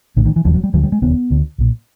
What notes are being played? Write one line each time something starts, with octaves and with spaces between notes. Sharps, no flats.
A#1 A2 D3
D#3
E3
E1 D#2 C#3 F3
F#3
G3
D2 D3 F#3
G3
G#3
E1 D#2 C#3 B3
D2 D3
B1 A#2